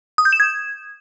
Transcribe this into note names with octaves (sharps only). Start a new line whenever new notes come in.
D#6
G6
E7
G#6